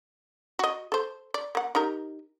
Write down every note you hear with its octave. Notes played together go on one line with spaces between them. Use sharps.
F#4 D#5
A4 C5
D5
A#3 F#5
D#4 G4 A#4